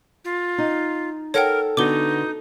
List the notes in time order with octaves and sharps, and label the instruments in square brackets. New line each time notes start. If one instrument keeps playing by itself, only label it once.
[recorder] F4
[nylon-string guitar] D#4
[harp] A4 [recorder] A#4 [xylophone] C#5 F#5 G5
[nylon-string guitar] D3 B3 F#4 [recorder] D#4 [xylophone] D6 G7